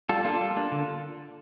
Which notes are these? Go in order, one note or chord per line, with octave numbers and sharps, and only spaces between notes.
G3 F4 A4
A#3 D4 F4 A4
G3
A#3 D4
D3